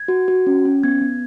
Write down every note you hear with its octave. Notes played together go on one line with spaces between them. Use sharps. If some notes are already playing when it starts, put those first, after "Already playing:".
Already playing: G#6
F#4
F#4
C#4
C#4
B3 G#6
B3